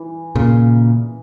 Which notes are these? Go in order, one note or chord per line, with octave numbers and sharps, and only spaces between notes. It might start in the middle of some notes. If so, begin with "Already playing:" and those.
Already playing: E3
A#2 C#3